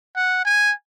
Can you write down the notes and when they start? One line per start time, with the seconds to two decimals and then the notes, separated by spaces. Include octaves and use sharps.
0.16 F#5
0.45 G#5